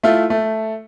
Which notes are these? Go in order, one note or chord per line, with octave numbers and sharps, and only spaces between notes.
A3 E4 F4
A3